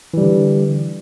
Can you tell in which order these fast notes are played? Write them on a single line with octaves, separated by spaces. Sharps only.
E3 G3 D3